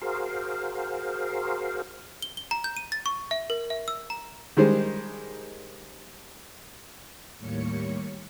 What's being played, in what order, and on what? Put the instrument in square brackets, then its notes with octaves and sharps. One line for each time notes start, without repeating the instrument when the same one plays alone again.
[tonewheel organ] F#4 G#4 A#4 C5 F5
[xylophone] G7
G7
A#5
G6
D#7
A6
C#6
E5
A#4
E5
E6
A#5
[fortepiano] D#3 G3 G#3 C5
[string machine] D#2 A2 G3 A#3 C#5 C#7